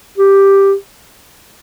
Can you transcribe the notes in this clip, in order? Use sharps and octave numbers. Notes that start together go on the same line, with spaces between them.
G4